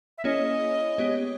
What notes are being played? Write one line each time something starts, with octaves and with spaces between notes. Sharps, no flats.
E5
A#3 C#4 E4 G#4 C#5 D#5
G#3 B3 G4 C#5